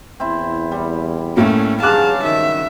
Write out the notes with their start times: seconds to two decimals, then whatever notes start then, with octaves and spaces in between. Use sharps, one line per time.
0.20 E2 C4 E4
0.72 G3
1.37 A2 A3 A#3 C#4
1.82 G2 C#3 F#3 G#4 F5 A5 D6 F#6
2.25 D#3 E5